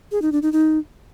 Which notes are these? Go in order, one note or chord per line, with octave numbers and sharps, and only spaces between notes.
G#4
D#4
D4
D#4
D#4